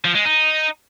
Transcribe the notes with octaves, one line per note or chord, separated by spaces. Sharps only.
F3
G#3
D#4